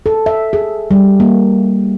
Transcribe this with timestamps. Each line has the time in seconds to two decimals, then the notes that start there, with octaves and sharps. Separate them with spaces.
0.06 A4
0.26 E5
0.53 G#4
0.91 G3
1.20 A#3